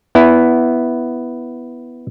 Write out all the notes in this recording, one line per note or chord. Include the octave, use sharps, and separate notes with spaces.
B3 E4